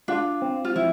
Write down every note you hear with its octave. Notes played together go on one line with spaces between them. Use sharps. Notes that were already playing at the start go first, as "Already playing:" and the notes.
D4 F4
C4
F4
F3 E4